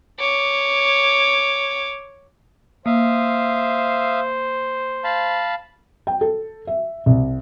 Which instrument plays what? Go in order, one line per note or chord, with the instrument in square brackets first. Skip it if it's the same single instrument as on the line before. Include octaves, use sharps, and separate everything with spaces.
[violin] C#5 D6
[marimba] A#3 [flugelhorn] C5 [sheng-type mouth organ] E5 F5 D#6
[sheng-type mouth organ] F5 A5 B5
[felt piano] G5
A4
E5
C2